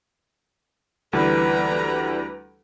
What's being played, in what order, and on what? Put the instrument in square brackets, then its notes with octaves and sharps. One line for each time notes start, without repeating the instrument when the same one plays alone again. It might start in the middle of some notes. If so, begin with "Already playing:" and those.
[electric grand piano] D2 E3 G3 [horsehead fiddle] B4 A#5